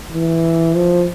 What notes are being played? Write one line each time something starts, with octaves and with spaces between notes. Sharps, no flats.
E3
F3